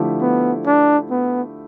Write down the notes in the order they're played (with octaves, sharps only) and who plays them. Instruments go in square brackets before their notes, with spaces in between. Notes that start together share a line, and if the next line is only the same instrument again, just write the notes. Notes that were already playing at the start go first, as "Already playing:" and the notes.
Already playing: [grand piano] D3 F3 A3 E4 G4
[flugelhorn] B3
D4
B3